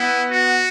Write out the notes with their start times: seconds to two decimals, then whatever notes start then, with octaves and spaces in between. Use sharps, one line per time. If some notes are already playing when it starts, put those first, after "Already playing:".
Already playing: B3 E4
0.31 F#4